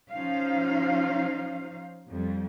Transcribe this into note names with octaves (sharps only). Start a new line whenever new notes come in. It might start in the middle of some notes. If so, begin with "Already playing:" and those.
F3 C#4 D#4 C5 F5
F2 G3